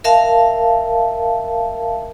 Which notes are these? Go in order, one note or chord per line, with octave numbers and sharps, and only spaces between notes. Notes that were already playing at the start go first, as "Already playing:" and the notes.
A#4 E5 F5 A5